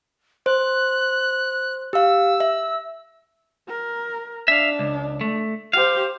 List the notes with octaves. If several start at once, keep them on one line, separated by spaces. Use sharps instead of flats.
C5 F#6
G4 F5 E6
E5
A#4
D4 E5 F5
C#2
A3
G4 C5 F5